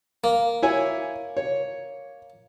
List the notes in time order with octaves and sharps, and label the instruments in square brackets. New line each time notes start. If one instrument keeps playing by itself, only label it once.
[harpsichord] A#3
[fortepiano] E4 C#5 G#5
C#5